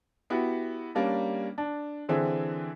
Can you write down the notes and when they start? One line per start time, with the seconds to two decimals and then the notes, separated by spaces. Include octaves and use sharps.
0.30 B3 E4 F#4 G4
0.95 G3 A#3 C#4 D4
1.58 D4
2.09 D3 E3 C4 G#4 E5